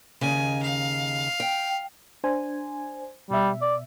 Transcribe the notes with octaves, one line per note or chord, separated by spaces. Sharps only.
D#2 C#3 D#4 G#5
F5
G5
D4 C5 G#5
B2 G3 E5
D5